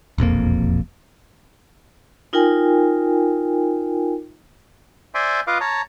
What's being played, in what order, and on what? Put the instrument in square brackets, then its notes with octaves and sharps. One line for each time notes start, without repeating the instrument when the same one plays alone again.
[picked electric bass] E1 A#1 F2 A#3
[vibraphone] D#4 F4 A#4 G5 G#5
[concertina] C5 D5 E5 G#5 C6 D6
F4 B4 D#5 F5 D6
C#5 A5 A#5